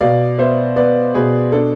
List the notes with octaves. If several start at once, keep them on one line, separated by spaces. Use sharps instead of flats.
B2 D5 F5
B3 C5 E5
B3 B4 D5
B2 G#4 B4
D4 A4